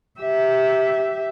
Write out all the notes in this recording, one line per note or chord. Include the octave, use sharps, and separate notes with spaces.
G4 E5